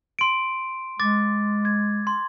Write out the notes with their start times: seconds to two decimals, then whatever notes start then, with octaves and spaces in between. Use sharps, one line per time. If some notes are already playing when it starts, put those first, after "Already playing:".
0.19 C6 D7
0.99 G#3 D6 A6
1.65 G#6
2.07 C6